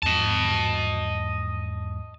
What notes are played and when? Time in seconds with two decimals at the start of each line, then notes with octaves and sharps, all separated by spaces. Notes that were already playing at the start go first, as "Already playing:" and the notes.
0.03 E2 G#2 F3 D#5 A5